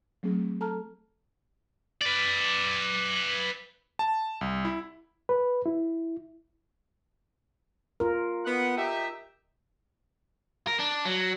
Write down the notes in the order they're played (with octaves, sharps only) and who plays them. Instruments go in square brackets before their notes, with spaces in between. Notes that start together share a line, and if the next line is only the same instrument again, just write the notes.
[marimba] F#3 A3 C4 G#4
A4 A5 A#5 F6
[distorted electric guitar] B4 D5
[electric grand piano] A5
C2
E4
[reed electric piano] B4
E4
[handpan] F4 A#4
[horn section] B3 D#4 F#5
D#4 G4 E5
[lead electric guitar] A#4
D4
F#3